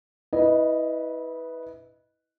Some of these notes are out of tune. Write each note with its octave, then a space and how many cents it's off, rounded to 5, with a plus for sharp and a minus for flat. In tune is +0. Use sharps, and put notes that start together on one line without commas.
E4 -25 B4 +0 D#5 -5